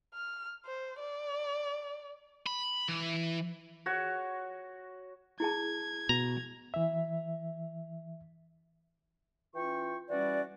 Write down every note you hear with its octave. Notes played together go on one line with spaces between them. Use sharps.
F6
C5
D5
B5
E3
F#4 C#5
E4 G#4 A5 G#6
B2 A#5
E3 E5
E3 C#4 F4 G5 C#6
E3 G3 C#4 F#4 D5